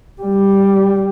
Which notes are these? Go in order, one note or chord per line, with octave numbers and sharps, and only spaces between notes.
G3